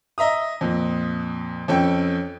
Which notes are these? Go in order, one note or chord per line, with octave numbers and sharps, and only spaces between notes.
D#5 E5 A#5 D#6
F2 A#2
F2 C#4 A4 G5